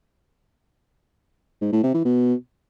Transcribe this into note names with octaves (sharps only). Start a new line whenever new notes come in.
G#2
A2
C3
E3
B2